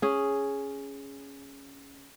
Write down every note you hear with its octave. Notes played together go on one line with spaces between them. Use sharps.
C#4 G#4